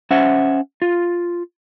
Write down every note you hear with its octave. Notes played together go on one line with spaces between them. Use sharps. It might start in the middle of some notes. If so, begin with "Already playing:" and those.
C#4 C5 E5 F#5
F4